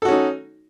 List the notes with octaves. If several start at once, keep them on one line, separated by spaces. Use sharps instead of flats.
C#4 D#4 F#4 A4